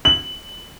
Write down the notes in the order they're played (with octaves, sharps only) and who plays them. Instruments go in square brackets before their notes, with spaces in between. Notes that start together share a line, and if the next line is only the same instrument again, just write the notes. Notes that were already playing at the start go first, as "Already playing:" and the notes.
[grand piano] F#7